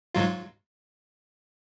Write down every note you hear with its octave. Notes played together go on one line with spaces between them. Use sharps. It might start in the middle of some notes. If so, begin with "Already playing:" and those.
G#2 F#3 F4